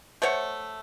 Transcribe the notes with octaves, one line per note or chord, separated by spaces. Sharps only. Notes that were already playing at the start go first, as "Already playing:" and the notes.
A3 C5 C#5 F#5